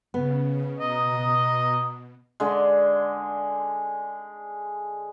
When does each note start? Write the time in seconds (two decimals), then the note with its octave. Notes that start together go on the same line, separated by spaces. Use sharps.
0.14 C#3 B3
0.79 B2 B4 D#5 A#5 D#6
2.40 D3 G#3